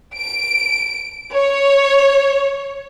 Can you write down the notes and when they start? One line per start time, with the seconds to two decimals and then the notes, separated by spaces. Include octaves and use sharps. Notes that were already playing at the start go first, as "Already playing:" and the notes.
0.16 D7
1.34 C#5